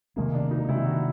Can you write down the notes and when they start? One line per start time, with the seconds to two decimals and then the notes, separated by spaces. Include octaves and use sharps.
0.16 C3 D#3 G#3 A#3 C4
0.34 D4
0.51 D#4
0.68 C3 D#3 G#3 C4 E4
0.86 F#4